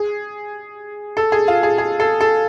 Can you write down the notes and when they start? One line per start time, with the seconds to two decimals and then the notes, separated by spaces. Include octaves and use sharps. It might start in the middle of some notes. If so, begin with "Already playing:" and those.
Already playing: G#4
1.17 A4
1.32 G#4
1.48 F4
1.63 G#4
1.78 G#4
2.00 A4
2.21 A4